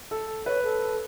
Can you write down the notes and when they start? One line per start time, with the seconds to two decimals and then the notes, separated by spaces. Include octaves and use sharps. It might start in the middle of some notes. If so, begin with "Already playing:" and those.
0.11 A4
0.46 B4 C#5
0.63 A4